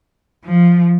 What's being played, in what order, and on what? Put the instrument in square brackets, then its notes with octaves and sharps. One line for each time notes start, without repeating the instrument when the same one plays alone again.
[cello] F3